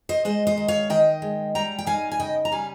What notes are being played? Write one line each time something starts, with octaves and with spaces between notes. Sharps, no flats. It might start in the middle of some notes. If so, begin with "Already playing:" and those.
C5 D#5
G#3 C5 D#5
C5 D#5
D#3
C#5 F5
D#3 D#5 G5
G#3
G3 G5 A#5
G5
D#4 F5 G#5
G#5
C#3 D#5 G5
A#5
G3 F5 G#5